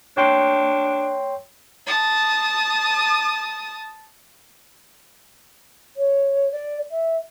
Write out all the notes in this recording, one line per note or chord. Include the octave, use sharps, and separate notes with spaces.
D4 C#5 G5 C6
A5 D#6
C#5
D5
E5